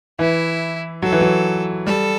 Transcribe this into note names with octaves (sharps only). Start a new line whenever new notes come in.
E3 E4
F#3 A4
E3
F#3
G3 A4